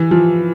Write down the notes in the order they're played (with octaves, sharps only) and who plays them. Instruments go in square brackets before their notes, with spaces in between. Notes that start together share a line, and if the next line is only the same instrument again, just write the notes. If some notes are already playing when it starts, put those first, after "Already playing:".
Already playing: [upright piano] E3
F3